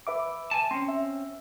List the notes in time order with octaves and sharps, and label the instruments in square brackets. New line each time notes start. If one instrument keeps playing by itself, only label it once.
[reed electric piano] B4 E5 D6
[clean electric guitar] G#5 A5
[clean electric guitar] C4 C#4 [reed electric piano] C6
[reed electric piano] E5